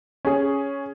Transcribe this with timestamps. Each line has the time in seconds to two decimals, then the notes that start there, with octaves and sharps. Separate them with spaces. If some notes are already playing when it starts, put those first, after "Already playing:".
0.25 C#4 G#4